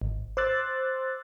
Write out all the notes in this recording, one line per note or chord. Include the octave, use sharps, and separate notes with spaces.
G#1
C5 C6 D6 E6 F#6 A6